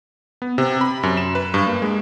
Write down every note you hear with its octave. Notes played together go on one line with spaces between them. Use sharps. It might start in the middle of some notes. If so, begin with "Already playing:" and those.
B3
C3
B5
F#2
E7
B4
G2
A#3
G#3